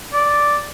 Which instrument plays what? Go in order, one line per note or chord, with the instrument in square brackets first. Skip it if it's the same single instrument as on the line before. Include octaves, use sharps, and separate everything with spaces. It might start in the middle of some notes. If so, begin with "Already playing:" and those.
[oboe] D5